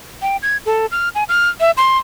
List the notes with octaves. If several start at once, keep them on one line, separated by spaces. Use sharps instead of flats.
G5
G#6
A4
F6
G#5
F6
E5
C6